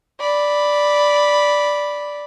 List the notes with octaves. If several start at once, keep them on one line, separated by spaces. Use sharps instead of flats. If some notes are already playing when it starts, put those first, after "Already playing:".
D5 B5